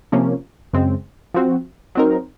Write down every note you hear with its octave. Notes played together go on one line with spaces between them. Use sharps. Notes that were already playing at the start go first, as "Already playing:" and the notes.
C3 F3 A#3 C#4
F#2 C#3 G#3 C4
F3 C4 F#4
F#3 C4 D#4 A#4